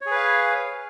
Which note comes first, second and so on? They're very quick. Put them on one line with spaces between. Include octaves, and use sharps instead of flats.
C#5 G#4 B4 F5